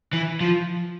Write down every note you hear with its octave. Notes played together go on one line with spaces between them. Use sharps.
E3
F3